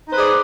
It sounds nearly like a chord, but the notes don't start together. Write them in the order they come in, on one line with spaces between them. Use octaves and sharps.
D#4 C5 B4 G#4 D5